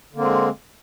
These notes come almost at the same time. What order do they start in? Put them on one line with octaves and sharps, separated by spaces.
D3 A#3 C4 G#3